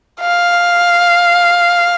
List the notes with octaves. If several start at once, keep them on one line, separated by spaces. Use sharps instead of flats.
F5